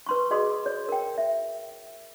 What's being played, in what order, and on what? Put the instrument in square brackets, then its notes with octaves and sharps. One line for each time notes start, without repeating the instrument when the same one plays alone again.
[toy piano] B4 C6 C#6
F#4 G#4 D#5 C6 D#6
C#5
A#4 G5
E5